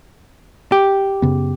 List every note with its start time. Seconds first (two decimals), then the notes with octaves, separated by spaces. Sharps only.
0.72 G4
1.22 F#2 C#3 B3